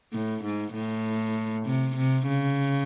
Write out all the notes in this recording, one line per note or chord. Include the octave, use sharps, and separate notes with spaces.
A2
G#2
A2
C3
C3
C#3